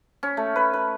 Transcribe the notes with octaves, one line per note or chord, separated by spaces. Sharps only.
C#4
A3
B4
B4